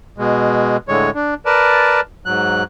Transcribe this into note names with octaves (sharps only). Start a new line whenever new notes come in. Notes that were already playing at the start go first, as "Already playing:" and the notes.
B2 G#3
A2 D3 G#3 C#5
D4
A#4 B4 D5 A5
G#2 F#3 F#6